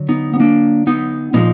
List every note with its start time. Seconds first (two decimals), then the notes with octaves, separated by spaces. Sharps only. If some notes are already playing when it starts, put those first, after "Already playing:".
Already playing: D3 F#3
0.09 B3 D#4
0.34 B3
0.40 A#3 D4
0.87 B3 D#4
1.33 A#2 F3 G#3 B3 D#4